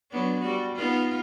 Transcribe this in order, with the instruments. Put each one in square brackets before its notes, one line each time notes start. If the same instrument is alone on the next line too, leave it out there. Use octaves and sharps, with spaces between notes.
[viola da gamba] F#3 B3 D4
G3 F#4
B3 D#4 F4